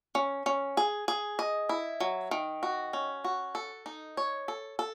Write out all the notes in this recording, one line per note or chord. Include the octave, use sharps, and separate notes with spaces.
C#4
C#4
G#4
G#4
D#5
E4
F#3
D#3
F#4
C#4
F#4
A4
D#4
C#5
A4
A4